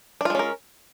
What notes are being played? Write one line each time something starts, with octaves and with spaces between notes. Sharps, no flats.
G#3 C#4 D4 F4 A#4